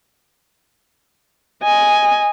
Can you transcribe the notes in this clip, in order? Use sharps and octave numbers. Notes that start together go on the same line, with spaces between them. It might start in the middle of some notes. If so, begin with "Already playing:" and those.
D#5 G#5